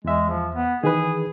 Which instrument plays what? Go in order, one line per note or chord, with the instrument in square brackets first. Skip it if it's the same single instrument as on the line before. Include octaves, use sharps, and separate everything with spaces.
[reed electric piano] E2 E5 [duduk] G#3
[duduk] F3
B3
[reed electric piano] D#3 E3 B4 [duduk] G#4